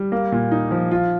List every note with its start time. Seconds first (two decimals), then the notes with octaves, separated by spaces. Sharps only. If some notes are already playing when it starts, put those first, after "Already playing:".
Already playing: G3
0.12 A#3
0.32 A#2
0.52 D#4
0.71 F3
0.91 F4